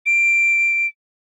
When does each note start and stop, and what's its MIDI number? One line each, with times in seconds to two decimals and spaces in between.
0.06 0.87 98